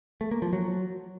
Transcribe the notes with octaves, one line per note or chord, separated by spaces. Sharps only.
A3
A#3
F3
F#3